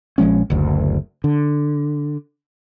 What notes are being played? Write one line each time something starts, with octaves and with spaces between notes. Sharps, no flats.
A#1 F3 G#3 C#4
F#1 D2
D3